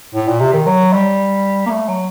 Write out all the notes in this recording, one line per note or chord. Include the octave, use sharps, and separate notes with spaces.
A2
A#2
C3
D#3
F#3
G3
A#3
A3
F#3